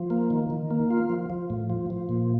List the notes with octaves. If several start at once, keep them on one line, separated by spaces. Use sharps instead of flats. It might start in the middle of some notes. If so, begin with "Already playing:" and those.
Already playing: F3
A#3
D#3
D#3
A#3
F4
F3
F3
A2
F3
F3
A#2